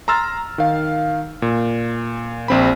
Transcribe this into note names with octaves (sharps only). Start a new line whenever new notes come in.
A#5 C6 E6 F6 A6
D#3 F5
A#2
A#1 C4 B5